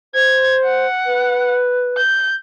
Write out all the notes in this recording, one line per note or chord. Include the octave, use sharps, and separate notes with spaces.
C5 G#6
F#5
B4
G6